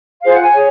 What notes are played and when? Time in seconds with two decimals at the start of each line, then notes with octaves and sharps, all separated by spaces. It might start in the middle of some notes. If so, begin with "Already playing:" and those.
0.23 F4 G#4 C5 F5
0.34 F#5
0.43 G#5
0.54 G#4 C#5